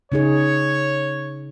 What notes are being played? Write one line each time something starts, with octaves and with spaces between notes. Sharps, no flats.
C#3 D#4 G#4 C#5